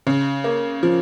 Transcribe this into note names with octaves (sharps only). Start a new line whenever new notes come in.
C#3
A#3
F3